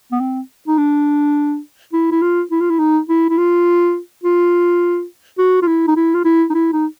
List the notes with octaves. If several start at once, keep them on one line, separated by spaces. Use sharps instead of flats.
B3
C4
D#4
D4
E4
E4
F4
E4
F4
E4
D#4
E4
E4
F4
F4
F#4
F4
E4
D#4
E4
F4
E4
D#4
E4
D#4